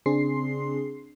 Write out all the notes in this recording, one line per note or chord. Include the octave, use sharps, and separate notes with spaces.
C#3 C4 D4 G#4 C6 C7